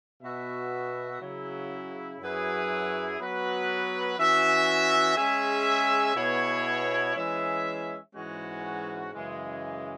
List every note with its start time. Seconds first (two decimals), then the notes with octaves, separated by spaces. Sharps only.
0.22 B2 B3 F#4 E5
1.21 C#3 F#3 E4
2.20 F#2 F#3 E4 G#4 B4
3.19 F#3 B3 F#4 B4
4.18 E3 C#4 F#4 E5
5.17 G#3 C#4 G#4 E5
6.16 B2 B3 E4 G#4 C#5
7.15 E3 G#3 C#4 G#4 E5
8.14 G#2 E3 G#3 C#4 F#4
9.13 F#2 C#3 E3 G#3